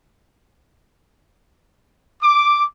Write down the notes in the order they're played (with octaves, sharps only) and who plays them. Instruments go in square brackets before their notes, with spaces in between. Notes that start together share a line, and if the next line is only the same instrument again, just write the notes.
[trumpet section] D6